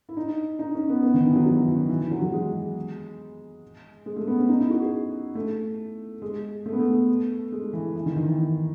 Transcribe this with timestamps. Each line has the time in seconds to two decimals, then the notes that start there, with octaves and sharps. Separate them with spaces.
0.09 E4
0.17 D#4
0.59 D#4
0.74 C#4
0.89 B3
1.03 B3
1.14 D#3
1.25 E3
1.35 F#3
1.46 F#3
1.60 E3
1.68 D#3
1.89 E3
2.01 E3
2.11 F#3
2.22 F#3
2.33 G#3
4.06 G#3
4.16 A3
4.27 B3
4.38 C#4
4.49 D#4
4.60 E4
4.71 F#4
4.82 G#4
5.35 A3
6.22 G#3
6.66 A3
6.72 B3
6.79 A3
7.52 G#3
7.73 E3
7.96 E3
8.06 D#3
8.16 D#3
8.28 E3
8.38 E3